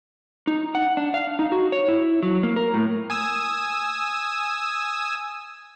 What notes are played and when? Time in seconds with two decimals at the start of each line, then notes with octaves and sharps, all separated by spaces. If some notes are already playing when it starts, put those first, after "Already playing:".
0.47 D#4
0.75 F#5
0.97 D4
1.14 F5
1.39 D#4
1.52 F#4
1.72 C#5
1.88 E4
2.23 F#3
2.43 A#3
2.56 A#4
2.74 A2
3.10 G#5 D#6 E6